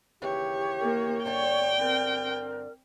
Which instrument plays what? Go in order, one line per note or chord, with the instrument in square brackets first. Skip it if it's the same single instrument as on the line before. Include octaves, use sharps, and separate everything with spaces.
[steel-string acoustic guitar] D#2 C#3 E3 [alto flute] G4 [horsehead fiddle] C#5
[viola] A#3
[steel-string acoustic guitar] G2 D3 D4 [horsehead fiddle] C#5 [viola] G5
[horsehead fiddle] C4 [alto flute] A#4